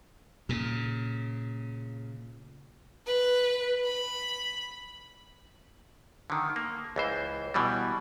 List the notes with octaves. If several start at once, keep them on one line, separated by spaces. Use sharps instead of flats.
A#2 C#3
B4
B5
D3 D#3
A#3
C#2 E3 C5
B2 E3 G3